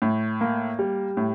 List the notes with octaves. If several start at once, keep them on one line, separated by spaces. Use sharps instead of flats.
A2
A#3
G3
A2